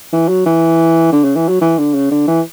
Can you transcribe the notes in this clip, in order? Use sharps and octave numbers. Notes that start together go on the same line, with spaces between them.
E3
F#3
E3
D3
C#3
E3
F#3
E3
D3
C#3
D3
E3